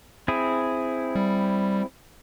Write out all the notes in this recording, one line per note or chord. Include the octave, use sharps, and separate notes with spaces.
C4 E4 G#4
G3